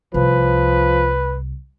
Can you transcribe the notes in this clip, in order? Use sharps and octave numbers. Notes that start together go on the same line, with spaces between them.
C2 F3 B4